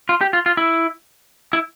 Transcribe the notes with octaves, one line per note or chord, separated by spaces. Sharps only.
F4
G4
F4
F4
E4
E4